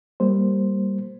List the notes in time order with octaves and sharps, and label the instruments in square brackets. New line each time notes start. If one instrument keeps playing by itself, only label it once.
[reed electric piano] G3 A#3 C5